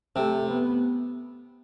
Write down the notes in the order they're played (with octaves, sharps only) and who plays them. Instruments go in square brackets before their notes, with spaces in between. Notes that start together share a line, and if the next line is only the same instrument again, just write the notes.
[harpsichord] C3 [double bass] A3
[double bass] B3